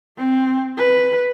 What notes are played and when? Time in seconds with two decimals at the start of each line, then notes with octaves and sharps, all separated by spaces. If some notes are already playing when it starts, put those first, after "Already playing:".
0.18 C4
0.78 B4